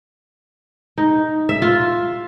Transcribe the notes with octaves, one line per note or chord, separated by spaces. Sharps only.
D#4
E5
F4